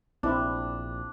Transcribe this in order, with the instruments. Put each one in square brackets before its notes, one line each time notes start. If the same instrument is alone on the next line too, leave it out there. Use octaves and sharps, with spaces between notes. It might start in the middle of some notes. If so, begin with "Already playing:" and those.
[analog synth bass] A#1 [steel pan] C4 E4 [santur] D4